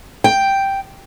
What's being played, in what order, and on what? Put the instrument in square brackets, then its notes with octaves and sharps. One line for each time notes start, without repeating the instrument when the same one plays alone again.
[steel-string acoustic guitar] G5